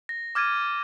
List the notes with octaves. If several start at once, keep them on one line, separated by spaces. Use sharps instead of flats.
A#6
D6 F6 G#6 A6 D#7